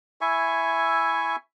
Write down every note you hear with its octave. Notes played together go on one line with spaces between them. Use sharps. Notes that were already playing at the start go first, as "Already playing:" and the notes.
E4 E5 G#5 C#6